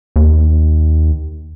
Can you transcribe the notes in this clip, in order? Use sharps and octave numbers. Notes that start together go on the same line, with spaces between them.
D#2